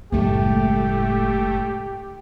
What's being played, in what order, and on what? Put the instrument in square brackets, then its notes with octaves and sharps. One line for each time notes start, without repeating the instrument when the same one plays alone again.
[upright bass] F#1 G#3 [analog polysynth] A2 A3 [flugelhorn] G4